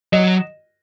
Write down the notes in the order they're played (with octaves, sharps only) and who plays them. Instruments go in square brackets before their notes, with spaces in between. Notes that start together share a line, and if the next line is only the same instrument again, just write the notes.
[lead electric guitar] F#3 [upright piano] D#5